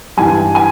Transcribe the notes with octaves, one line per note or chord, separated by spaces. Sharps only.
G2 E3 G3 G#5
G#5